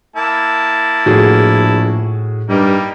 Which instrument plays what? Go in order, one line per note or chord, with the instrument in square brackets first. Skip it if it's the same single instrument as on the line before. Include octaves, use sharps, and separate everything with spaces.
[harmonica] A#3 E4 A5
[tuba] A#1 [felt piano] A2 F#4 G#4
[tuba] G2 [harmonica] G3 A#3 D#4